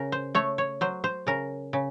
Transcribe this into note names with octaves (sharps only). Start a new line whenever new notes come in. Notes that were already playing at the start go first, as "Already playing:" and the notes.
Already playing: C#3 A#4
C5
A3 C#5
C#5
F#3 C5
C5
C#3 A#4
C#3